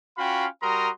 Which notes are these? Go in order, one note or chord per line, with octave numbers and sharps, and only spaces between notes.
C#4 F4 F#4 F5 G5 B5
G3 F#4 A#4 A#5 C6 D#6